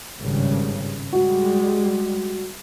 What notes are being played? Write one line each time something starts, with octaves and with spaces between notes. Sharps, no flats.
G#1 G2 C#3
G3 G#3 F#4